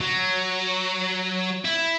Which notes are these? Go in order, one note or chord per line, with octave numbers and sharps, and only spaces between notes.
F#3
E4